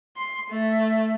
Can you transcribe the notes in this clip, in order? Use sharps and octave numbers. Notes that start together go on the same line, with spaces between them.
C6
A3